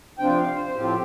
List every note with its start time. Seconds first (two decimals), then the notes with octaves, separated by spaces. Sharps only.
0.19 C3 F3 D4 F4 G5
0.37 F5
0.55 C5
0.74 A2 F3 C4 F4 G4